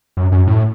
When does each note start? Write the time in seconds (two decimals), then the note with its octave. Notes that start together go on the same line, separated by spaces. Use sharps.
0.17 F#2
0.32 F#2
0.47 A2